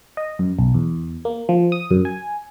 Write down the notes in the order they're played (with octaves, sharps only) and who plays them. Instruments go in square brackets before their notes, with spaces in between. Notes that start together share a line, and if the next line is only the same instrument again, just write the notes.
[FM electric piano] D#5
F#2
B1
E2
A#3
F3
D#6
F#2
G#5